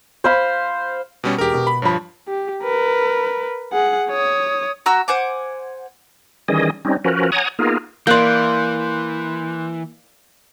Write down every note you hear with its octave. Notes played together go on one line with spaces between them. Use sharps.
C5 F5 B5
B2 G3 C#4
E1 G4 G#4 A#4
B2
B5
G2 F3 C#5 A5 B5
G4
A#4 B4
G#4 F#5
C#5 D#6
F#4 A#5 E6
C5 F#5 G#5 D6
D#3 E3 G3 C#4 G#4 D#5
G3 C4 C#4 D#4
F3 C#4 F#4 A#4 B4
C#5 F#5 G#5 A#5 D#6
A#3 B3 D#4 F4 G#4 A#4
E3 A#3 D5 C6 F#6 G6